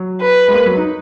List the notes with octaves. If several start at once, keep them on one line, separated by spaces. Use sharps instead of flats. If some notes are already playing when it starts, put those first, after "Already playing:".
Already playing: F#3
B4
G#3
A#3
F#3
D#4